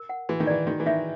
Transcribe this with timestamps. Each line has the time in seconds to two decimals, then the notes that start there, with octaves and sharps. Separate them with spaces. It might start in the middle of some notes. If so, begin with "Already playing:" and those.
Already playing: A#4
0.09 F#5
0.29 E3 F#4
0.40 D#3
0.47 E3 D5
0.67 D#3 F#4
0.80 E3
0.86 D#3 E5